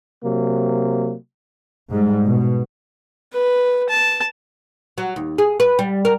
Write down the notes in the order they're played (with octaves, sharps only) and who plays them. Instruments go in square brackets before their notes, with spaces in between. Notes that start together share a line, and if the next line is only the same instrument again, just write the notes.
[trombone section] C3 F#3 A#3
[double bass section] G#2 G3
B2
[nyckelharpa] B4
A5
[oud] F#3
D#2
G#4
B4
G3
A#4